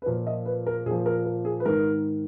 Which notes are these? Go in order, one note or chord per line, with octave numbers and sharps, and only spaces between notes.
B4
A#2 F3 A#4
D#5
B4
A#4
A#2 F3 G#4
A#4
A#4
G#4
B4
G#2 D#3 A#4